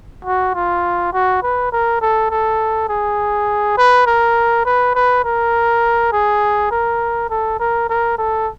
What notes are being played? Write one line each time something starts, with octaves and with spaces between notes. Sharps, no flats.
F#4
F4
F#4
B4
A#4
A4
A4
G#4
B4
A#4
B4
B4
A#4
G#4
A#4
A4
A#4
A#4
A4